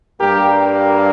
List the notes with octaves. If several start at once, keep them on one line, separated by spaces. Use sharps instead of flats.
G2 G3 A#3 G4 A#4